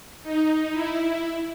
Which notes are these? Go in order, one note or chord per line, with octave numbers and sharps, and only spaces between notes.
D#4
E4